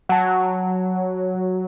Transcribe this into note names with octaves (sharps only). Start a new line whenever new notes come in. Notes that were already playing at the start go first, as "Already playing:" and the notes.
F#3 F#5 A5